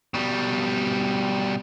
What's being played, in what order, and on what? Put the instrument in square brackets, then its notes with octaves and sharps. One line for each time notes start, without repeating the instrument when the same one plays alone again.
[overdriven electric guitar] B2 G3